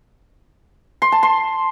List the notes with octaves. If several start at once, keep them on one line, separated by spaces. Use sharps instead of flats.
C6
A5
C6